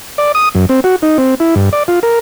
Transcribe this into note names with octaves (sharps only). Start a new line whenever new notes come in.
D5
D#6
F#2
C4
F#4
D#4
C4
E4
G2
D5
F4
A#4